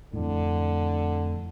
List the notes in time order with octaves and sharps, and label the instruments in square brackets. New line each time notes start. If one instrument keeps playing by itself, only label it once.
[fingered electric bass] F2 A2 [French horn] D3